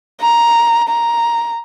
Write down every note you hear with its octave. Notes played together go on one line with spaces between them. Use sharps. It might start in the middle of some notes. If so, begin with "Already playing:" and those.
A#5
A#5